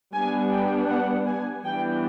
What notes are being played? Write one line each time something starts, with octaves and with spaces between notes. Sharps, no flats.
G3 B3 D4 G#5
G5
F#5
G#5
E3 G3 B3 D4 G5